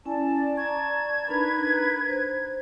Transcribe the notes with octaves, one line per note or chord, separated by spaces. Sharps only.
C#4 E4 D5 G#5 A5
A#5 C#6 G#6
D4 D#4 A#4 B4 B5
C5